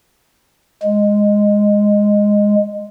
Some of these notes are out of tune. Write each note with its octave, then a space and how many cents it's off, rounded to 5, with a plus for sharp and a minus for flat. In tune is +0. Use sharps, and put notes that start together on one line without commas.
G#3 -5